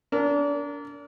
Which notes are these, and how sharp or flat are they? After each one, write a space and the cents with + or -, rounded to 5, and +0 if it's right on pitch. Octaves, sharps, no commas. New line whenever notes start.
D4 -30 A#4 -20